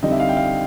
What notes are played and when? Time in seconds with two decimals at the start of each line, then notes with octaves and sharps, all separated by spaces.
0.02 D3 G3 C4 D#4 D#5
0.12 E5
0.20 F5
0.29 G5
0.37 F5